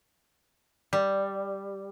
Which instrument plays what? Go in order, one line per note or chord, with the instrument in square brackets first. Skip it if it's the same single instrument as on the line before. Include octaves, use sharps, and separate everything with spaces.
[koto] G3